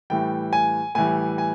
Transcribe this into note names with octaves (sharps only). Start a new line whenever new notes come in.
A2 E3 G3 G5
G#5
A2 E3 G3 G#5
G#5